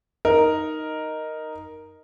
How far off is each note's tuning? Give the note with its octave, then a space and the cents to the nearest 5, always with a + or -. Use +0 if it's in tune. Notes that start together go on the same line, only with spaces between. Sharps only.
D#4 +0 A#4 +0